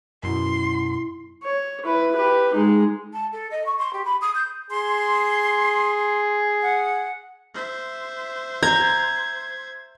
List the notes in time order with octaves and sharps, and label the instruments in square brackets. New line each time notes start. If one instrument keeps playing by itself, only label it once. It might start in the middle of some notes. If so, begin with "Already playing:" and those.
[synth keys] F#2 B2 [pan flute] E4 [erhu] C6
[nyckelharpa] C#5
E4 B4
G4 B4
G#3 D#4
[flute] A5
A4
D#5
C#6
C6
G4
B5
D#6
G6
[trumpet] G#4 [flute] C6
[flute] F#5
[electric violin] C5 E5
[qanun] A#5 [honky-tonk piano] G6 [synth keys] G#6